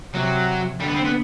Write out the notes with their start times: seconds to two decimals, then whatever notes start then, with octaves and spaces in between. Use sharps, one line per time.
0.14 C3 F#3
0.80 D3 G3
0.88 B3
0.95 C4
1.05 B3